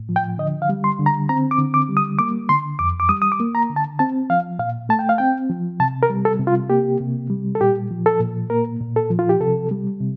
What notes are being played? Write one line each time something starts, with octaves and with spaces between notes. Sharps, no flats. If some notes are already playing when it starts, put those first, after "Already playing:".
Already playing: A2
F3
G5
D3 D#5
F5
G3
C6
D3
A#5
C4 A#5
D6
D3
D6
G3
D#6
A#3 D6
D3 C6
F2 D6
D6
G3 D#6
D#6
D6
A#3
A#5
D3
A5
C4 A5
F3 F5
A#2 F5
A3 A5
G5
F5
C4 G5
F3
C3 A5
A#4
G3
A4
C3
F4
A#3 G4
C3
G3
A4
A#2 G4
F3
A4
A#2
A#3 A#4
A#2
A4
F3
F4
G4
C3 A4
G3
C3